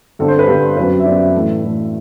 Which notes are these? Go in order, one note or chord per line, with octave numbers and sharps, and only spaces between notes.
G2 D3 G3 C4 A4
C5
B4
G2 D3 G3 C4
F#2 F#3 C4 B4
E5
F#2 F#3 C4 D5
E5
A2 E3 A3
A2 E3 A3